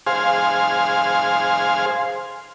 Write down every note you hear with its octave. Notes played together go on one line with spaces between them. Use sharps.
G#4 C5 F5